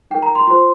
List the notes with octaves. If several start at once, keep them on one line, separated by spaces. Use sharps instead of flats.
D#4 A#4 G5
A#5
C6
F4 C5 C6